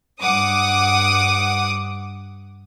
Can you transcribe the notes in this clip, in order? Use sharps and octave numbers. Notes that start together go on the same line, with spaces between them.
G2 F#5 D6 D#6